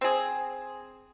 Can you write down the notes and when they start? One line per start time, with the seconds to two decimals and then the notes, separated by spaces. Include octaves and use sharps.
0.01 C4 G#4